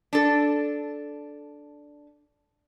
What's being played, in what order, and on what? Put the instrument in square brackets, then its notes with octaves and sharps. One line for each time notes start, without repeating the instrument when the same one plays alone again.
[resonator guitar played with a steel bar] D4 A4